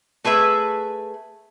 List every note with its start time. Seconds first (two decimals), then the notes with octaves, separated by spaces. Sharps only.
0.25 A3 G#4 B4 E5